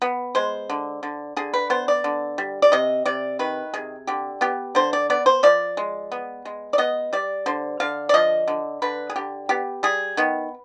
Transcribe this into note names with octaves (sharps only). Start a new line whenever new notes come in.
B3
G#3 C5
D3
D3
D3 G#4
B4
B3 C5
D5
D3
G3
D5
C3 D#5
C3 D5
D#3 B4
C3 G#4
D3 G4
B3 G4
D3 C5
D5
B3 D5
C5
F3 D5
G#3
B3
G#3
D5
B3 D#5
G3 D5
D3 C5
D3 F5
D5
F3 D#5
D3
D3 B4
G#4
D3 G4
B3 G4
G3 G#4
D#3 B3